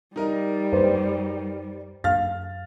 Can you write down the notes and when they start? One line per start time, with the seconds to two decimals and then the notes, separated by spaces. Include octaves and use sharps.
0.16 G3 D#4 A#4 D#5
0.73 F#2 B4 C5
2.04 F#2 F5 F6 A6